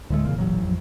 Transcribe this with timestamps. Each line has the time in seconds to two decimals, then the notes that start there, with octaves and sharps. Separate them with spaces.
0.10 D2 A2 G#3 A3
0.25 F1 A#2 C#3 E3 A#3
0.38 A1 F#3
0.62 F2